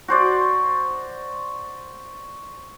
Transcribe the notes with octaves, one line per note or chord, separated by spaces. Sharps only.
F#4 C5 D5